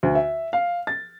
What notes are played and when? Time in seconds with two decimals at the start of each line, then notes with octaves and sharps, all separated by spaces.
0.03 D2
0.15 E5
0.53 F5
0.87 A6